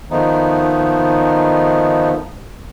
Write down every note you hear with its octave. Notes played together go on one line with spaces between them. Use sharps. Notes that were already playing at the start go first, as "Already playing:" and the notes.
D#3 F3 A3 B3 D#4